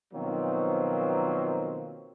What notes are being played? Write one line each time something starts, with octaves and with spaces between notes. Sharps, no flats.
B2 D#3 F3 F#3 A#3 C4